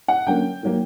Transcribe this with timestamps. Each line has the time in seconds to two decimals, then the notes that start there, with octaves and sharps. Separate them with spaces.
0.08 F#5
0.26 D3 F#3 A#3 C#4 G5
0.63 D#3 F#3 A#3